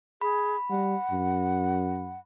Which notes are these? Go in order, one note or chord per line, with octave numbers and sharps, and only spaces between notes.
G#4 B5
G3 F#5
F#2